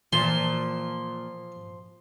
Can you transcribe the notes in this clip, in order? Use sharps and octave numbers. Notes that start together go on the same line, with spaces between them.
A#2 E3 F3 C6